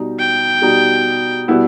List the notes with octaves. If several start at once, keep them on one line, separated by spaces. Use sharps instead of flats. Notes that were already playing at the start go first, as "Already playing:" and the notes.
Already playing: B2 G3 D#4
G5
B2 G3 D#4
B2 G3 B3 E4